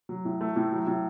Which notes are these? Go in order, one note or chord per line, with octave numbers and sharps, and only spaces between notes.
F#3
A2
A3
A2
F#3
A2